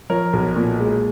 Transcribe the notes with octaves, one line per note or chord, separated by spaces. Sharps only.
F3 A#4 C#5
B1
A#2
G#3